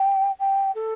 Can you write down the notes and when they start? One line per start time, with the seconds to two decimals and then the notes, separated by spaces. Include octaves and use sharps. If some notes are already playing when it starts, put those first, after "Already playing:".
Already playing: G5
0.39 G5
0.75 A4